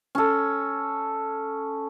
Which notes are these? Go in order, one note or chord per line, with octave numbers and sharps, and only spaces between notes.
C#4 A4